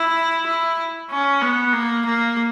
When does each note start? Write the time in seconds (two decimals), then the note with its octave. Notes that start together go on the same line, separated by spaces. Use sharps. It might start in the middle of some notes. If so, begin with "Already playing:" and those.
Already playing: E4
0.47 E4
1.11 C#4
1.42 B3
1.73 A#3
2.06 A#3